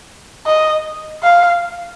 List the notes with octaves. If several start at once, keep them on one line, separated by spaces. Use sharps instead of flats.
D#5
F5